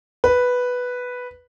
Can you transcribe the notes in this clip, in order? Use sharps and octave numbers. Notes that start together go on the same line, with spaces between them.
B4